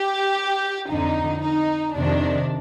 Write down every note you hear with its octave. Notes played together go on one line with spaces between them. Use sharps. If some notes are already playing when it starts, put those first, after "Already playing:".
Already playing: G4
F2 D3 D#4
D#4
F2 C3 D#3 D4